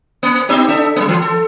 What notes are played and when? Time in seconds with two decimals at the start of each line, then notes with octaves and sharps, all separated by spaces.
0.23 A#3
0.49 B3 D#4 G4
0.68 D4 A4 E5
0.96 G3 A#3
1.08 E3
1.22 A4